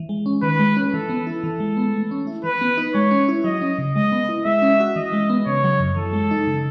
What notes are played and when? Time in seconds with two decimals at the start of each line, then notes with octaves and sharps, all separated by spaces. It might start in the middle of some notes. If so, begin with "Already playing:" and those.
Already playing: E3
0.09 G#3
0.26 C#4
0.43 D#3 B4
0.59 G#3
0.77 C#4
0.93 E3 A4
1.10 B3
1.27 E4
1.44 E3 A4
1.60 G#3
1.77 B3
1.94 A3
2.11 C#4
2.27 E4
2.44 E3 B4
2.61 B3
2.77 D#4
2.95 G#3 C#5
3.11 C#4
3.28 E4
3.44 F#3 D#5
3.61 C#4
3.78 C#3
3.95 G#3 D#5
4.12 B3
4.29 E4
4.45 G#3 E5
4.62 C#4
4.80 F#4
4.96 E3 D#5
5.13 G#3
5.30 B3
5.47 C#3 C#5
5.64 F#3
5.80 F#2
5.97 E3 A4
6.13 G#3
6.31 D#4
6.47 C#3